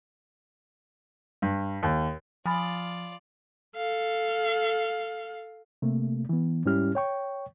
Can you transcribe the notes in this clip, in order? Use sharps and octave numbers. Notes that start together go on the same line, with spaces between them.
G2
D#2
F3 F4 D5 G#5 B5 D#6 F6 A6
A4 F5
C3 A3 A#3
E3 B3
G#2 G3 C#4 E4 G4 F6
C#5 G5 C#6